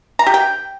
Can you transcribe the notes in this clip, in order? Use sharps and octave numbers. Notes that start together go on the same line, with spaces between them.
A#5
G4
G5